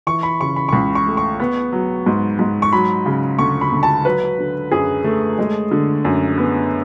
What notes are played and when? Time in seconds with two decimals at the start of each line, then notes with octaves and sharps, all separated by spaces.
0.07 E3 C#6
0.23 B5
0.40 C#3 C#6
0.56 B5
0.69 C#6
0.73 C#2 B5
0.95 C#6
1.07 A3
1.17 C#6
1.40 B3
1.72 F#3
2.06 G#2
2.39 G#2
2.62 C#6
2.72 F#3 B5
3.06 C#3
3.39 D2 C#6
3.61 B5
3.72 D2
3.83 A5
4.05 F#3 B4
4.39 D3
4.72 F#2 G#4
5.04 A3
5.39 G#3
5.71 D3
6.05 F#2
6.38 B3